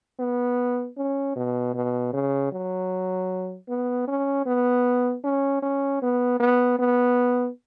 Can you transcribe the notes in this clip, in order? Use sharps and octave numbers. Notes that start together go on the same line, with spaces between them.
B3
C#4
B2
B2
C#3
F#3
B3
C#4
B3
C#4
C#4
B3
B3
B3